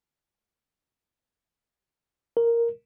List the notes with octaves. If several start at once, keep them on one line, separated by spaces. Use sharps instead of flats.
A#4